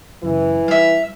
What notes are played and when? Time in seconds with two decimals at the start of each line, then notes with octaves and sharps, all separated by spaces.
0.23 F#2 C#3 E3
0.68 G3 E5 F5